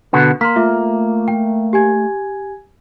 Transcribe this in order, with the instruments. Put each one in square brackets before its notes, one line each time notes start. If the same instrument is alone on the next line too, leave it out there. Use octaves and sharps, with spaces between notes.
[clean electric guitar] B2 D3 B3 [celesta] C#6
[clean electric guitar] A#3 [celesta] C6 B6
[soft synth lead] A3 [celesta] F4 E5 D6
[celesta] G5
G4 G#5 G#6